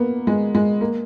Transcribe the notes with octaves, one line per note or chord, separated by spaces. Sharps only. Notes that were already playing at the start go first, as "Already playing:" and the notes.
Already playing: A#3 B3
G#3
G#3
A#3